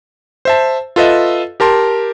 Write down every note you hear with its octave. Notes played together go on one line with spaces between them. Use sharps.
C5 E5 A5
F4 A4 B4 D#5 E5
G4 A#4 A5 C6